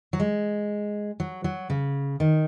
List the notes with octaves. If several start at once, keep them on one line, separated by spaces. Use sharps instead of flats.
F#3
G#3
F#3
F#3
C#3
D#3